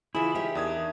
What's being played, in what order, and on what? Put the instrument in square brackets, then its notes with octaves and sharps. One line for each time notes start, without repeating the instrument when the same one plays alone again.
[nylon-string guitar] C#3 E3 [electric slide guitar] E4 [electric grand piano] F4 B5 [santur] G#4
[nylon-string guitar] D#4 C#5 E5 [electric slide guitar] G4
[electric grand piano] E2 D#6 G#6 [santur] D4 A#4 G5